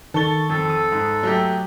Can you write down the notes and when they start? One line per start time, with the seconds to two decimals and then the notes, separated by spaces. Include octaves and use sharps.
0.14 D#3 A4 C#6 A6 G7
0.50 F2 A4
0.70 D#6
0.92 G#2
1.23 F#3 A3 G4